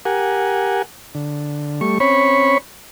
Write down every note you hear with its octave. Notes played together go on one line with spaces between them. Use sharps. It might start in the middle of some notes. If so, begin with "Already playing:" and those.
G4 A#4 F#5 G#5
D3
G3 A3 C#6
C4 C#4 C#5 B5 C#6